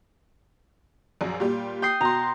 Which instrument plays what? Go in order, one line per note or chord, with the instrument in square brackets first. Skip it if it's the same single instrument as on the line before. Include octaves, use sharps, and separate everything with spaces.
[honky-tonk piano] A#1 F#2
A#2 G3 G4
[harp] G5 D#6 C7
[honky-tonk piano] B2 C6 [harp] A#5